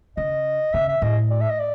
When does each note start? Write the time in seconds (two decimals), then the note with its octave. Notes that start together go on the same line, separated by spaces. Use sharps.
0.17 C#3 D#5
0.73 C#3 E5
0.89 E5
1.02 A2 D#5
1.30 D5
1.41 E5
1.50 D#5
1.60 D5